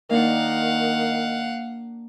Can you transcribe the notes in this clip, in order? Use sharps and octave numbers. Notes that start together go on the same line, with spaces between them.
D#3 A#3 D4 F5 F#5